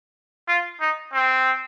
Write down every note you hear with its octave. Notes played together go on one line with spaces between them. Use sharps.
F4
D#4
C4